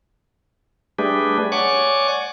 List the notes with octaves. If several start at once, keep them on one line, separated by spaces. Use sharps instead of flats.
G3 A3 D4 G4 G#4 B4
C#5 D5 F#5 G#5 C#6 D6